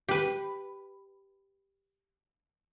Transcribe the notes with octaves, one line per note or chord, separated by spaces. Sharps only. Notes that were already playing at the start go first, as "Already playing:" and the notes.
G4 B4